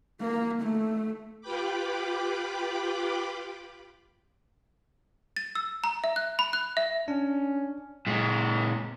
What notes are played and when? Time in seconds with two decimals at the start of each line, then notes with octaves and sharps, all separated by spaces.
0.21 A#3
0.62 A3
1.41 F4 G4 B4 G5 B5 D6
5.37 A6
5.55 E6
5.84 A#5
6.04 E5
6.16 F#6
6.39 B5
6.53 F#6
6.77 E5
7.08 C#4 D4
8.07 A#2 G#3